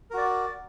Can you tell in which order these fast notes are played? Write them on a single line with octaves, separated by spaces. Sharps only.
A#4 F#4 D5